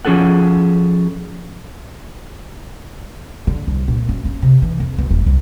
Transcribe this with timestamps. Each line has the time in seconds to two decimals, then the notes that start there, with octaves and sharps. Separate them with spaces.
0.05 F3 C#4 G#4 A4 F#5
3.47 D3
3.67 C2
3.88 A#2
4.09 F#2
4.25 C#4
4.42 C3
4.62 E3
4.80 F2
4.98 B1
5.11 D#1
5.27 C2